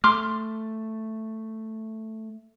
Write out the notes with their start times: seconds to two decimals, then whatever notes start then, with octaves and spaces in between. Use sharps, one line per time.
0.04 A3 C6 D6 F6